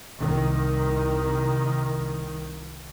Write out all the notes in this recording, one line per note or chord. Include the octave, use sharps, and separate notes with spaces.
C2 D#3